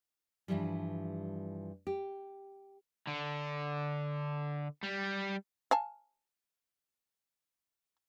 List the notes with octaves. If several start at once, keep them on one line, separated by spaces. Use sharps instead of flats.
G2 B2 E3 F3 G3
G4
D3
G3
F5 G#5 A5